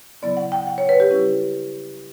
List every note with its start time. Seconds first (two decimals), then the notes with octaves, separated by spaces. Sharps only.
0.22 C#3 F#3 B3 E4 D5
0.37 F#5
0.52 G5
0.67 F#5
0.78 C#5
0.89 B4
1.00 G4
1.11 C#3 G3 C#4 E4